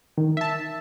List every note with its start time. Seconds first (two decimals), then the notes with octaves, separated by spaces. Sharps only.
0.17 D#3
0.37 E5 A5